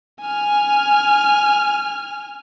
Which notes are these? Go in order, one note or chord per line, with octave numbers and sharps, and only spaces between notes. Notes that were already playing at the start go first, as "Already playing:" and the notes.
G#5 F6